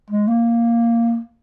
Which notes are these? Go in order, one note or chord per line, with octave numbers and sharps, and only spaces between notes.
G#3
A#3